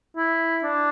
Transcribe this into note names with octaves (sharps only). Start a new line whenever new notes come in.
E4
D4